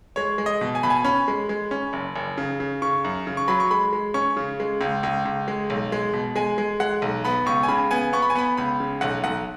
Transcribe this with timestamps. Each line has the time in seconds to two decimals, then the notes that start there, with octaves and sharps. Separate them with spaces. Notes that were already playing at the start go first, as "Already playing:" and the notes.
0.16 G#3 C#5
0.38 G#3
0.46 D#5
0.61 B2
0.75 G#5
0.83 B2 B5
0.90 G#5
1.04 C#4 B5
1.28 G#3
1.49 G#3
1.71 C#4
1.93 F#1
2.16 F#1
2.38 C#3
2.60 C#3
2.82 C#3 C#6
3.05 F#2
3.27 C#3
3.37 C#6
3.48 F#3 B5
3.60 C#6
3.71 G#3 B5
3.93 G#3
4.14 C#4 C#6
4.37 C#3
4.60 G#3
4.81 C#2
5.03 C#2
5.25 C#2
5.48 G#3
5.70 B1
5.92 G#3
6.13 B2
6.36 G#3 G#5
6.58 G#3
6.80 G#3 F#5
7.02 B1
7.25 B3 B5
7.46 C#2 C#6
7.63 G#5
7.68 C#3 B5
7.91 B3 G#5
8.13 B3 C#6
8.22 B5
8.30 G#5
8.35 B3 B5
8.57 C#2 B5
8.80 C#3
9.01 B1 F#5
9.24 B1 F#5